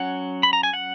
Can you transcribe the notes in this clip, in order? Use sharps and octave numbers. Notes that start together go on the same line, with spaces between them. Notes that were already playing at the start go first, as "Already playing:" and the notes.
Already playing: F#3 C#4 F#5
B5
A#5
G#5
F#5